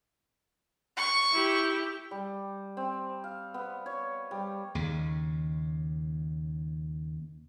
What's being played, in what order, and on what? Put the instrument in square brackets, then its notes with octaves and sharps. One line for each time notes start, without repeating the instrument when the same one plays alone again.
[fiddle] C#6
[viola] E4 G4
[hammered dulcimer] G3
C4
F5
B3
C#5
G3
[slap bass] D#2 C#3